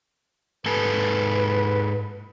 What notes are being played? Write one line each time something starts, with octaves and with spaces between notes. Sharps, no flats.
G#2 A4 B4 G#5